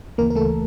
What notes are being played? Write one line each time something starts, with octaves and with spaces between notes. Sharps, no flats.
D2 C#3 E3 A#3 A#4
A#4
A3 A4